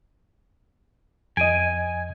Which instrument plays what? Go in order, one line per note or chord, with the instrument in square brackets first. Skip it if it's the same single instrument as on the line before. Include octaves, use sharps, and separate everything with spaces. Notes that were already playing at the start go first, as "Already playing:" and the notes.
[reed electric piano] F2 D#5 [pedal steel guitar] G#5 [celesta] D7 D#7